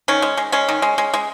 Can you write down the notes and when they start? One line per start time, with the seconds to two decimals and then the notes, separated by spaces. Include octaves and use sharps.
0.08 D#3 C#4
0.22 G#3
0.37 G#3
0.52 G#3 C#4
0.69 D#3
0.82 G#3
0.98 G#3
1.14 G#3